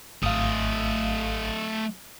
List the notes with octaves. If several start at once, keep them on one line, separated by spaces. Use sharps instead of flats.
G#1 A3 D#5 F5